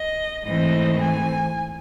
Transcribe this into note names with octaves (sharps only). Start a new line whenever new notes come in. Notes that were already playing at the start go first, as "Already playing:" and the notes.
Already playing: D#5
G#2 E3 A3 C4 D#5
G#5